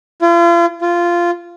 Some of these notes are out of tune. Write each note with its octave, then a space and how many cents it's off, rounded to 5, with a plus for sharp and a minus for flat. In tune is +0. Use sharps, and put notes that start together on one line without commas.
F4 -40
F4 -10